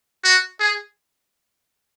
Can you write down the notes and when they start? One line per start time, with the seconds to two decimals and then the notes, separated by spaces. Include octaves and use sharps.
0.24 F#4
0.60 G#4